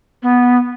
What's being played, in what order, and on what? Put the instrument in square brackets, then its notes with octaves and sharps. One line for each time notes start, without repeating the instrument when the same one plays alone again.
[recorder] B3